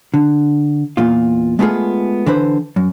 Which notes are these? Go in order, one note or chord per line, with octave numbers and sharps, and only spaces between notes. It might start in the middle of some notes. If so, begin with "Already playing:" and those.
D3
E2 A#2 F4
G#3 A3 B3 D4 F4 G#4
D3 E3 B4 C5
F#2